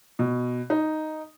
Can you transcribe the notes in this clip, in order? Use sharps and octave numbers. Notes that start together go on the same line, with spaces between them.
B2
D#4